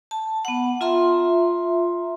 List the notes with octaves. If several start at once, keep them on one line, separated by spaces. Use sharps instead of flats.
A5
B3 F#5
F4 E5 A#5 C6